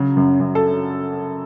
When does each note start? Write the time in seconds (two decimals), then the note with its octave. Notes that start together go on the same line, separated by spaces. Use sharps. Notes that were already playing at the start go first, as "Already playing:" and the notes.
Already playing: C#3 F#3
0.17 F#2
0.40 F#2
0.55 A4